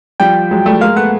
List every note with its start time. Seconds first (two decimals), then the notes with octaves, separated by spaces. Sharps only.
0.20 F3 G3 G5
0.51 F#3 G#3
0.66 G3 A3
0.81 G#3 A#3 F5
0.96 A3 B3 F#5